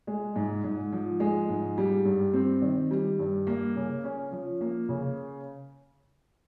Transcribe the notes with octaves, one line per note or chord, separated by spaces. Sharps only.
G#3
G#2
G#2
F3
G#3
G#2
G3
G2
C4
D#3
G3
G2
A#3
C#3
C#4
F3
A#3
C#3